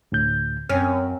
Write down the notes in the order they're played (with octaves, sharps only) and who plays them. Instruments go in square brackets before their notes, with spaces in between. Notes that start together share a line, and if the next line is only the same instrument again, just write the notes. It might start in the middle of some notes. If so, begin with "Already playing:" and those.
[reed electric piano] D2 A2 G6
[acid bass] F#2 [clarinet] C4 [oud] C#4 [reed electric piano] F6